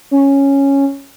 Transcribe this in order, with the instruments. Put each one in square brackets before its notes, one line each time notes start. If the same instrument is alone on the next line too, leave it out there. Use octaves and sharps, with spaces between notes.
[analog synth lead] C#4